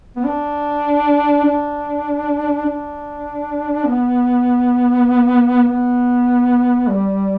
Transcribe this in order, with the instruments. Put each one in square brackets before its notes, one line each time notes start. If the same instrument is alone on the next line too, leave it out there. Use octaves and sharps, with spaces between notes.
[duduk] B3
D4
D4
D4
B3
B3
G3